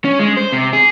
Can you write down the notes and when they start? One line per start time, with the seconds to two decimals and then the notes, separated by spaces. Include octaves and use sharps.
0.05 C#4
0.19 G#3
0.37 C5
0.53 C3
0.73 G#4